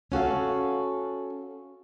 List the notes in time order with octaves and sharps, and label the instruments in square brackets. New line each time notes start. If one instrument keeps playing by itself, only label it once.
[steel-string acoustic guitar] C#4 F#4 A4 F5